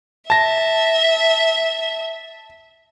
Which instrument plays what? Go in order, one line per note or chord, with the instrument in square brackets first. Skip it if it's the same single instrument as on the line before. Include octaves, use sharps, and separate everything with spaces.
[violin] E5 [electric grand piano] A5 A#6